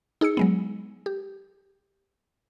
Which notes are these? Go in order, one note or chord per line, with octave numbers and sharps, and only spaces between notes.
D#4 G#4 E6 C#7
F#3 G#3 B3
G4